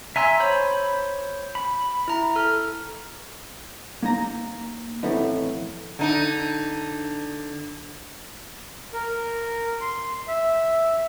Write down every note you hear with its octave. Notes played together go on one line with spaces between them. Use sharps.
E5 G#5 A#5 C6 E6
C5 C#5 B5
B5
E4 A#5
A4 F6
A#3 D#4 A#5
F2 A2 E3 A3 B3 D#4
D3 D#4
A#4
C6
E5